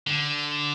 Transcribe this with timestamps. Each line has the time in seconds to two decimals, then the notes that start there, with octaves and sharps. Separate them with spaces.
0.07 D3